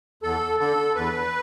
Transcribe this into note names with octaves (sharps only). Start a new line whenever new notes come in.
E2 A4
D3 A4
E2 B4